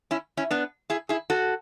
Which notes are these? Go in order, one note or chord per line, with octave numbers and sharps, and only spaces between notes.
C#4 E4
C#4 E4
B3 D4
E4 G#4
E4 G#4
F#4 A4